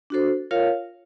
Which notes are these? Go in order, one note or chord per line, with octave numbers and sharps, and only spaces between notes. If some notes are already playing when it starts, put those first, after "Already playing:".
D4 F#4 A4 C5
F4 A#4 C#5 F5